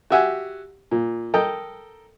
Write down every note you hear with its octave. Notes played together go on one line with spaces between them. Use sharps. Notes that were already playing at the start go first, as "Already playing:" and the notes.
F#4 G4 E5 F#5 G#5
A#2
A4 A#4 D#5 G5